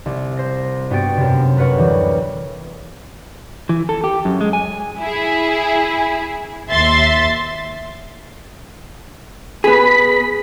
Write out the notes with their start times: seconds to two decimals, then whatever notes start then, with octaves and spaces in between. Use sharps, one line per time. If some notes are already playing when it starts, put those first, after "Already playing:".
0.06 C2
0.37 C5 A#6
0.90 G2 B3 F#4 G5 A6 D7
1.17 F#2 C3
1.57 A#4 B4 C#5 F#5
1.77 D2 E3 G3
3.69 E3
3.89 A4
4.04 G4
4.25 F#2
4.41 G#3
4.53 G#5
5.00 E4 G#4
6.68 D#2 E5 C6 A6
9.64 B3 G#4 B5